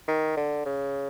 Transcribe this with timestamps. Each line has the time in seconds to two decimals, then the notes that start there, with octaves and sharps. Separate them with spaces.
0.08 D#3
0.37 D3
0.66 C#3